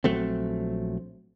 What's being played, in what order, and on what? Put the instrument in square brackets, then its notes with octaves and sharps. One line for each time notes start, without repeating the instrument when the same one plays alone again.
[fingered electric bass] A#1 F#3 A3 C4